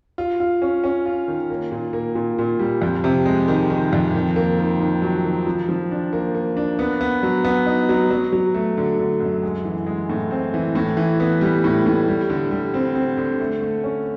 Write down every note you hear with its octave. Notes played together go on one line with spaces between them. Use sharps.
F4
F4
C#4
C#4
F4
D#3
A#3
A#2
A#3
A#2
A#2
G3
F2
C3
G#3
D#3
D#3
F2
D#3
A#3
D#3
D#3
F#3
D#3
F3
F3
D4
A#3
A#3
D4
B3
B3
F#3
B3
D#4
F#3
F#3
F#3
A3
D3
D3
F#2
G#3
E3
G#3
A2
C4
E3
A2
E3
B3
G3
A2
A2
G3
D3
G3
C4
C4
D3
A3
A3
C#4